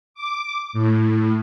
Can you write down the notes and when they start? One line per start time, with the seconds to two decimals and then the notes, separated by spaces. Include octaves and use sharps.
0.14 D6
0.73 A2